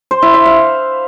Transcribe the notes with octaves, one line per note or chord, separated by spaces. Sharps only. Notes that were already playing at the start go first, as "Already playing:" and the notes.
C5
E4
E5
F5